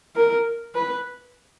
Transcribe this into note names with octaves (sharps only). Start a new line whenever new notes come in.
A#4
B4